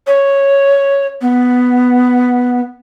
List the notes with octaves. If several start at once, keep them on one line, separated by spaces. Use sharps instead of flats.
C#5
B3